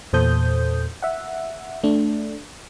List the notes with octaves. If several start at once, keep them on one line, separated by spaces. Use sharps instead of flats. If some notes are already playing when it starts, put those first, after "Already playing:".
E2 A#2 A4 C5 D#6 G6
E5 F#5
A3 D4